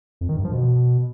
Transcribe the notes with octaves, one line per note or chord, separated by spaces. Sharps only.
F2
D#3
G2
F3
B2